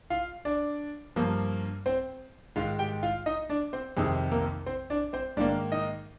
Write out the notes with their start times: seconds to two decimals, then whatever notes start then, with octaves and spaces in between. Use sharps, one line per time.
0.10 F4 F5
0.45 D4 D5
1.16 G2 F3 A#3
1.86 C4 C5
2.56 G#2 D#3 G#3 F4 F5
2.79 G4 G5
3.03 F4 F5
3.26 D#4 D#5
3.50 D4 D5
3.73 C4 C5
3.97 F2 C3 D#3 G#4
4.31 A#3 A#4
4.66 C4 C5
4.90 D4 D5
5.13 C4 C5
5.37 G#2 D#3 A#3 D4 D5
5.72 D#4 D#5